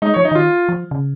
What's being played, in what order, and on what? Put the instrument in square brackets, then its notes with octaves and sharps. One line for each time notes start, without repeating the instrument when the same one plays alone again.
[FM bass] G#3 [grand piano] D#4
[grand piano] C#5
[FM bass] F3
[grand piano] D#4
[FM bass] D#3 [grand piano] F4
[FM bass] F3
C#3